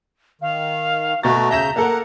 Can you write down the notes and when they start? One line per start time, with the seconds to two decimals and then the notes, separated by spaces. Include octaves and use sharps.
0.41 D#3 F5
1.23 B2 A3 F#4 A#5 A6
1.51 C#3 E5 G6 A#6 E7
1.76 A#3 A4 A#4 F#5